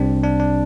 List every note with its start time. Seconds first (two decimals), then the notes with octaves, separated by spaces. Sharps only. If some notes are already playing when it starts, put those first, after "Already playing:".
Already playing: C2 C3 G3 C4 D4
0.23 D4
0.40 D4